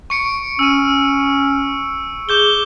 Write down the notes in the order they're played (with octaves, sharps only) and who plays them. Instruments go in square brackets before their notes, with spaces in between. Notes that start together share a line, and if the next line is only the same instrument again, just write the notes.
[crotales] C#6 C#7 D7
[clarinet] C#4 [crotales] E6 D#7
[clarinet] G#4 [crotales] D6 G6 G7